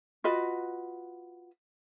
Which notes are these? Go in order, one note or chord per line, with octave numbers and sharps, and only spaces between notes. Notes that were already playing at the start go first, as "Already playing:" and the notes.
F4 F#4 B4 D#5